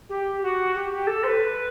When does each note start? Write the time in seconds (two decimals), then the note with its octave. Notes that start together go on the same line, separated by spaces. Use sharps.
0.09 G4
0.42 F#4
0.75 G4
0.91 G4
1.07 A4
1.23 C5
1.27 B4